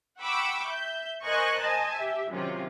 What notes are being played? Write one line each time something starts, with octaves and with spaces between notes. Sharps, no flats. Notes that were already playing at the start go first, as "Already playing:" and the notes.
F#5 G5 B5 C#6 D6 E6
E5 G6
A#4 C5 D#5 G#5 C#6 F#6
C5 D#5 G#5 A5
G4 E5
F#2 C3 D#3 C#4 F4